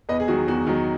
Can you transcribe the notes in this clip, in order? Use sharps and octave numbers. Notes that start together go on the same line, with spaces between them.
E2 B4 D#5
G#4
D#3 F#3 F#4
E2 F#4
D#3 F#3